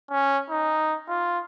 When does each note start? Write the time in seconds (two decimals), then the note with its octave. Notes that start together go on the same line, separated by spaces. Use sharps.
0.10 C#4
0.50 D#4
1.08 F4